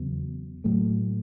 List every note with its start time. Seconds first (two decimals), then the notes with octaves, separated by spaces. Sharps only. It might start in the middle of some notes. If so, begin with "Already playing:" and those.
Already playing: E2 C#3 F#3 B3
0.64 A2 F#3 A3